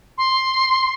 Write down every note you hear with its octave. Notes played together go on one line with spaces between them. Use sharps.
C6